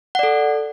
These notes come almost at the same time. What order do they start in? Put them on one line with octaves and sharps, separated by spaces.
F#5 D5 A4